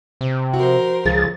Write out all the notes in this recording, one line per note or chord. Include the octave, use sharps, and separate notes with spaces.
C3
F3 F#4 A#4 C5
C#2 F3 G#4 A6